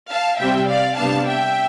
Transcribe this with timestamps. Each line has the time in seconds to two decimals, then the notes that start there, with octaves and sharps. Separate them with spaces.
0.11 F5 A5
0.39 C3 G3 C4 E5 G5
0.69 D5 F5
0.98 C3 G3 B3 D4 F5 A5
1.28 E5 G5